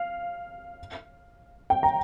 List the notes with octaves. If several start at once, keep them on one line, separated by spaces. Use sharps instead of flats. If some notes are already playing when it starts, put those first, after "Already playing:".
Already playing: F5
G5
A#5